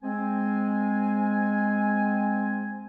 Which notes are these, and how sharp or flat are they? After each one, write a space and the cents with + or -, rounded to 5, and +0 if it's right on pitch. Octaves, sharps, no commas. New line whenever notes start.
G#3 +0 C4 +0 G#5 +0